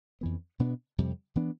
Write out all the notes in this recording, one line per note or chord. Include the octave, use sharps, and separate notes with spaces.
F2 E3 B3
B2 B3 D4
F2 C3 G3
E3 B3 D4